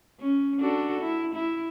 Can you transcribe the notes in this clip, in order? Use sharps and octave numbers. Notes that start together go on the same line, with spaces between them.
C#4
D4 F#4 A4
E4
E4